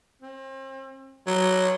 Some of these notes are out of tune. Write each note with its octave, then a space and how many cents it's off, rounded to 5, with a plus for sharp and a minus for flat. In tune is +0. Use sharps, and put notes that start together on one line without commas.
C4 +40
F#3 +5